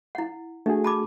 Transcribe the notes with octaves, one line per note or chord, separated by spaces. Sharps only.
E4 F#5
A3 D4 F#4 G#4
A5 B5 D6